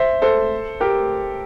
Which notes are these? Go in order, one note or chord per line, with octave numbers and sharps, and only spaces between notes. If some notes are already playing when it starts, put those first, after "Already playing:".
Already playing: C5 E5
A4 C5
G4 A#4